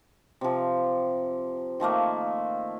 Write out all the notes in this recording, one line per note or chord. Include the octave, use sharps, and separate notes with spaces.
C3 F3
D#3 F3 A3 A#3